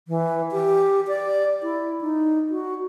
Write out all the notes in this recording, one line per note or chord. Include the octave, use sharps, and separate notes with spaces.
E3
G4
D5
E4
D#4
F#4